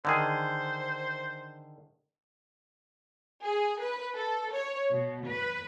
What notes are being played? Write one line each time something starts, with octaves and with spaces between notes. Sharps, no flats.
D3 D#3 G#4 C5
G#4
B4
A4
C#5
B2
B4